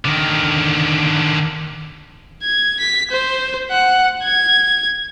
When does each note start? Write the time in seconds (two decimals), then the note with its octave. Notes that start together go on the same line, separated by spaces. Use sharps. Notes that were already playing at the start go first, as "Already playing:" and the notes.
0.05 D3 D#3
2.43 G#6
2.80 B6
3.11 C5
3.71 F#5
4.23 G#6